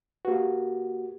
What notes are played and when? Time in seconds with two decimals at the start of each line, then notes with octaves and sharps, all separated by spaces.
0.25 A#3 F#4 G4 B4